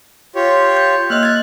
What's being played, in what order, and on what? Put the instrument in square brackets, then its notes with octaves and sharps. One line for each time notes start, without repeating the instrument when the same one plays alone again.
[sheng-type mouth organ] F4 G4 C#5
[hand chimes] G6
[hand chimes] A#3 D#5 [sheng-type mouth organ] F6 F#6
[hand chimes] G#6 A6